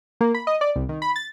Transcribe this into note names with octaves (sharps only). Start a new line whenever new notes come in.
A#3
B5
D#5
D5
C2
D#3
B5
A6